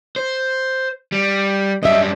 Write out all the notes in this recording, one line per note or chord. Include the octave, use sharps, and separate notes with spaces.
C5
G3
F#2 G3 D#5 E5